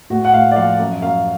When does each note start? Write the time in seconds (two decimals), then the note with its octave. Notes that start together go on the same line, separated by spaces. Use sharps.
0.10 A2 F#4
0.25 F#5
0.33 A2 F5
0.52 D5
0.56 F3 F5
0.79 F#2
1.02 F#2 F5